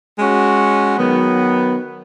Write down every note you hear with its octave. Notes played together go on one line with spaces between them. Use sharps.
G#3 C#4 F#4
D#3 F#3 B3